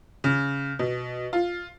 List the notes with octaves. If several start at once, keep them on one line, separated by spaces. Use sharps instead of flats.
C#3
B2
F4